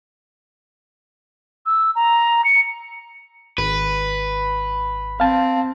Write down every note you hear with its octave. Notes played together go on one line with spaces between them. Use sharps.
E6
A#5
C#7
G#1 B4
C4 F5 A5